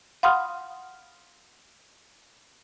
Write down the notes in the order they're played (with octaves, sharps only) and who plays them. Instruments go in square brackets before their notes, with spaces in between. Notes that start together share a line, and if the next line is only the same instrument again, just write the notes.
[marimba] F5 F#5 B5 C6 D#6 F6